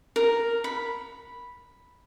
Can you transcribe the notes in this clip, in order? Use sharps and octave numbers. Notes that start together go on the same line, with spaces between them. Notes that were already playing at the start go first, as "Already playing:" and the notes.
A#4
B5